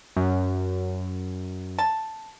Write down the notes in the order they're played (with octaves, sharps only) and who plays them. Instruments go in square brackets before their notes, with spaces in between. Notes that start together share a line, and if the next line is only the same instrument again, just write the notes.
[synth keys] F#2
[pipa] A5